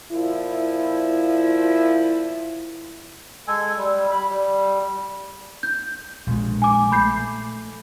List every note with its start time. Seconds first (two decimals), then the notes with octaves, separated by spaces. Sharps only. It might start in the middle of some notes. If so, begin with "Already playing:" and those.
0.12 A#2 F3 E4
3.48 G#3 A4 G#5
3.77 G3
4.11 B5
4.30 G3
5.63 G6
6.27 A#1 G#3
6.62 G#5 D6
6.92 A3 B5 G6 C7